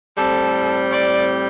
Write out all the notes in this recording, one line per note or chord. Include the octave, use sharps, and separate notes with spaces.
A2 G3 C4 A4
D5